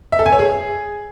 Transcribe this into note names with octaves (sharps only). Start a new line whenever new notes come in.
E5
A4
G#5
C#5
G#4